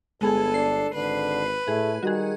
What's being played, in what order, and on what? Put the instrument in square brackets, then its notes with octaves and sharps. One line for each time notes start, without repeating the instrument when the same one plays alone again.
[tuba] G1 [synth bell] G#3 B3 G#4 [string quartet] A4
[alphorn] D4 [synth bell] C7
[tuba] G#1 [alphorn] D3 [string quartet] B4
[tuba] A2 [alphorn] A3 [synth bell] G#4
[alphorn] D#3 [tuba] G3 [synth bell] F#4 G#4